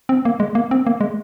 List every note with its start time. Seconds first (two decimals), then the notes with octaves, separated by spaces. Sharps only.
0.09 C4
0.25 A#3
0.40 G#3
0.55 A#3
0.71 C4
0.87 A#3
1.01 G#3